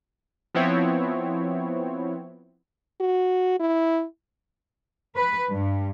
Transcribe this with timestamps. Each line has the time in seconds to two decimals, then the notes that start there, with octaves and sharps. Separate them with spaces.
0.54 F3 B3 C4 E4 C#5
3.00 F#4
3.59 E4
5.16 B4
5.49 G2